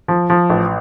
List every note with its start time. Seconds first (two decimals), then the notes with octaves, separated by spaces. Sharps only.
0.08 F3
0.30 F3
0.50 A1